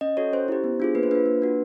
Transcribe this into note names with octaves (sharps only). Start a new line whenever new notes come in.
C#4 D#5
F#4 A4 C#5
C#4 C5
E4 G4
B3
D4 F4 G#4
A#3 B4
C5
D4 F4 B4
A#3
D4 F#4